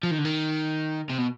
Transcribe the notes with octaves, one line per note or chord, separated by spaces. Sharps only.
F3
D#3
D3
D#3
C3
B2